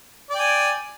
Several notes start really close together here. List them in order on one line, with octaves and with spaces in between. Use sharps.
D5 G5 G#5